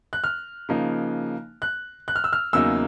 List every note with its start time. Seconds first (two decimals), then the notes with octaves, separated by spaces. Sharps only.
0.13 F#6
0.24 F6
0.69 C#3 F3 A#3 D#4
1.62 F#6
2.08 F#6
2.16 F6
2.24 E6
2.33 F6
2.53 E2 C#3 F#3 A#3 D#4 E6